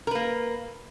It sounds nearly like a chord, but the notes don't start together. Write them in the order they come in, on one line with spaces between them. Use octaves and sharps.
A#4 B4 A#3